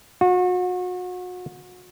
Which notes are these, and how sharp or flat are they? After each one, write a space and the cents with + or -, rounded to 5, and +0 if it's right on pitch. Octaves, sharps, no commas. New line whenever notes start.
F#4 -35